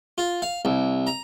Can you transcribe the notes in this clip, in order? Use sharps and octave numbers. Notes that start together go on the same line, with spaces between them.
F4
F5
C2
A#5